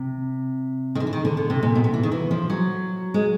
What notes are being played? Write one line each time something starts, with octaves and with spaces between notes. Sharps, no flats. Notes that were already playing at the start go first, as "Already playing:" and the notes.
Already playing: C3
D#3
D3
E3
D#3
D3
D3
C3
A#2
B2
C3
E3
D#3
E3
F3
F#3
G#3